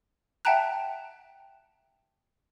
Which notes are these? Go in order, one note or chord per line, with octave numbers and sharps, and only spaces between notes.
E5 F#5 G5 A5 A#5 F#6